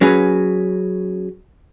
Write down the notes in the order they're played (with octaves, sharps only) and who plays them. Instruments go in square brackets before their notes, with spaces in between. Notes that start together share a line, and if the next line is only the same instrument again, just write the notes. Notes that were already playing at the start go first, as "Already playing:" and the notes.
[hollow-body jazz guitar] F#3 C#4 F#4 G#4 B4